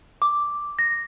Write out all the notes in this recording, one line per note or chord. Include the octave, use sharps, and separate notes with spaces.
D6
A#6